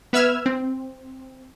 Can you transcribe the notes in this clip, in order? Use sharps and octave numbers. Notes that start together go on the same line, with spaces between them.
B3 B4 E5 E6 F6 G#6
C4